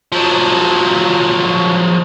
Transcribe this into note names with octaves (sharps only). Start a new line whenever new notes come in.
F3 F#3